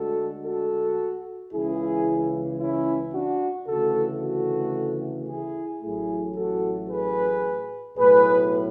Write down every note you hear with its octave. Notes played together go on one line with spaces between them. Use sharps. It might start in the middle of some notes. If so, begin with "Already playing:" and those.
Already playing: D2 D3 G#3 F#4 A4
F#4 A4
C#2 C#3 E3 E4 G#4
C#4 E4
D4 F#4
D2 C#3 E3 A3 F#4 A4
F#4 A4
E4 G#4
A1 A2 F#3 A3 E4 G#4
F#4 A4
G#4 B4
B1 A2 F#3 G#4 B4